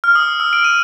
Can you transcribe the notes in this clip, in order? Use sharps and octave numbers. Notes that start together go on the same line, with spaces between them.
F6
D#6
E6
D7
D#7